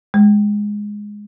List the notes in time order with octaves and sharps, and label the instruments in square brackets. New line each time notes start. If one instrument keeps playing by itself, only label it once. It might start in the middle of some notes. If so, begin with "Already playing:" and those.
[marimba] G#3